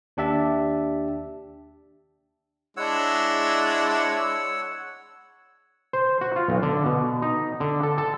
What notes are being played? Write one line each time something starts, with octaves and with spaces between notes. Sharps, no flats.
D#2 D4 G4 E5 A5
G#3 D4 E4 C#5 F#5 E6
C5
F#4
F4
B1
D3
B2
D#4
D3
A4
A4